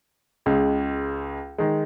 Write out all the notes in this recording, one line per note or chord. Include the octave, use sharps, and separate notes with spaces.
C#2 C#3 G#3
D#3 G#3